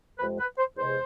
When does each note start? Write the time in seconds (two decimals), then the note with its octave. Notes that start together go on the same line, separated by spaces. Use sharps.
0.19 F2 C3 G#3 B4
0.39 B4
0.58 C5
0.77 E2 C3 G#3 C5